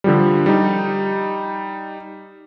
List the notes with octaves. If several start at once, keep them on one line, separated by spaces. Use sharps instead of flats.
D3 F3 G3
G3 D#4